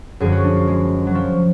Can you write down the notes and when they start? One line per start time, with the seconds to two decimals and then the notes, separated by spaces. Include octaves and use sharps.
0.20 F#2 D3 F3 G#4
0.32 F#4
0.44 D4
0.56 F4
0.68 G#3
1.07 F#3
1.15 F3